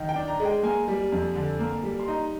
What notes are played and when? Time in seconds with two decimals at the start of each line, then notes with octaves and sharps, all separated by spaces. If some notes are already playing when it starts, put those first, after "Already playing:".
Already playing: D#3
0.09 G5
0.16 D4
0.28 A#5
0.40 G#3
0.45 G5
0.63 A#3 G#5
0.88 G3
1.12 F2
1.35 D3
1.59 A#3
1.83 G3
2.00 C6
2.08 D#4 A#5